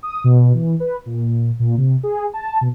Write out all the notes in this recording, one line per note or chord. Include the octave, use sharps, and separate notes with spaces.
D#6
B2
E3
B4
A#2
A#2
C3
G#4
A5
B2